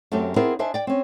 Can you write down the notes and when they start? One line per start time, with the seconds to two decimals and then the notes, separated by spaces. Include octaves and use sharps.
0.12 F#2 F#3 A3 C4 G4
0.36 B3 C4 E4 G#4 A#4 C5
0.59 D4 C5 D#5 E5 G#5
0.74 D5 G5
0.87 C4 C#4